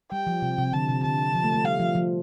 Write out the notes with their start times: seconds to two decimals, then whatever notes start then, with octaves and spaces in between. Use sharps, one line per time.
0.11 G3 G5
0.27 F3
0.42 C3
0.58 C3
0.73 D3 A5
0.89 C3
1.03 D3 A5
1.35 F3
1.44 A3
1.54 A3
1.64 G3 F5
1.79 F3
1.95 F3